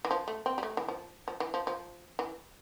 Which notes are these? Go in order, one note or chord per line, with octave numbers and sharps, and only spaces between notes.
E3
F3
A3
C4
G3
A3
E3
F3
F3
E3
F3
F3
E3